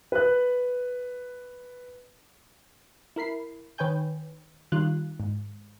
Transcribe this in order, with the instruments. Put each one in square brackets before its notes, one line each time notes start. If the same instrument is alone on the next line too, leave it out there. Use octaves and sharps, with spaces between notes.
[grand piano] B4 F#6
[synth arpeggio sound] E4 A#4 B5 C7
D#3 B4 C#5 G5 G#5 G6
D#3 G3 F4 F#6
G#2